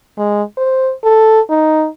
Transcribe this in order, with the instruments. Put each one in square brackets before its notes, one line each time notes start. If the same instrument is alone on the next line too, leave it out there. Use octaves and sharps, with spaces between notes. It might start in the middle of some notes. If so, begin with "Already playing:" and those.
[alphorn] G#3
C5
A4
D#4